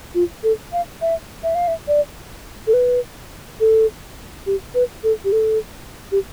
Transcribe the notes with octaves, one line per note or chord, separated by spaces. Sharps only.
F4
A4
F5
E5
E5
F5
E5
D5
A4
B4
A4
G4
B4
A4
G4
A4
G4